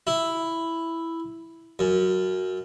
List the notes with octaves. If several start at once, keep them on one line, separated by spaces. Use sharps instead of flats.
E4
F#2